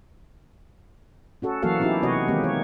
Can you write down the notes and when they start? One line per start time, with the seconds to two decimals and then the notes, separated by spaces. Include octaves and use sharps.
1.42 C#4 F#4 A4
1.63 E3 F#3 A#3 F#4 A4 F5
1.79 B3 C#4 D#4 E4 F#4 G4
2.02 C3 F#3 B3 F#4 C#5 D#5
2.28 D#3 E3 G#3 A#3 C4 G4
2.44 C#5